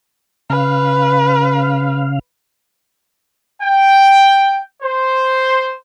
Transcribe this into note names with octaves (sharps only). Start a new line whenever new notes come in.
C#3 B4 F5
G5
C5